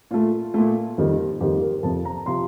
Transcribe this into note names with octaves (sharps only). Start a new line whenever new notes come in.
A#2 A3 F4
A#2 A3
F2 D#3 G3 A#3
F2 D#3 G3 A#3 G4
A#4
F2 C3 F3 A5
A#5
C3 F3 C6